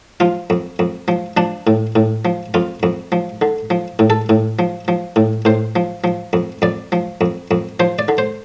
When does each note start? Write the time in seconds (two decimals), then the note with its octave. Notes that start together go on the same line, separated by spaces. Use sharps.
0.20 F3 F4
0.50 F2
0.79 F2
1.08 F3
1.37 F3 D4
1.67 A2
1.96 A2
2.25 F3
2.54 F2 F4
2.83 F2
3.12 F3
3.42 D3
3.70 F3
3.99 A2
4.10 A4
4.29 A2
4.59 F3
4.88 F3
5.16 A2
5.45 A2 C5
5.76 F3
6.04 F3
6.33 F2
6.62 F2 D5
6.92 F3
7.21 F2
7.51 F2
7.80 F3 C5
7.99 D5
8.08 D3
8.18 C5